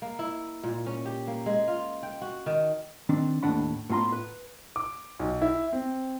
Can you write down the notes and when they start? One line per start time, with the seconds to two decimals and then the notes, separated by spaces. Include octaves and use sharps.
0.02 A#3
0.19 E4
0.64 A#2
0.86 C#4
1.05 G4
1.27 A#3
1.46 G#3
1.68 F4
2.03 G5
2.22 F#4
2.46 D#3
3.09 D#3 C4 D4
3.43 D#2 A2 D4 F#5 B5
3.90 A2 B3 F4 A#5 C6
4.12 B4
4.76 D6
5.19 B1
5.42 E4
5.73 C4